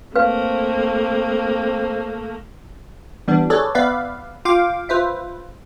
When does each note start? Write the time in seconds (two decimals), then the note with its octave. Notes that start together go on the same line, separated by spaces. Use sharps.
0.16 A3 A#3 C4 B4 F5
3.28 E3 G3 B3 D4
3.50 G#4 A4 B4 C#5 D5
3.75 B3 B4 D5 E5 F5
4.45 F4 F5 G5 D6
4.89 F4 B4 C5 E5